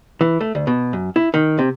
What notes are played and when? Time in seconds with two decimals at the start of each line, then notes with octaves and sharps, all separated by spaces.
0.21 E3
0.41 A3
0.55 D2
0.67 B2
0.93 F#2
1.16 E4
1.34 D#3
1.59 C3